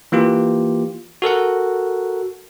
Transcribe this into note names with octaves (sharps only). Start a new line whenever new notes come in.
E3 A#3 F4 G4
F#4 A4 A#4 F#5